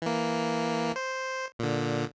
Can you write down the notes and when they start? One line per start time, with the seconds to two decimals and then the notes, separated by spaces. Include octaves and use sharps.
0.02 E3 A#3
0.96 C5
1.59 A#2 D3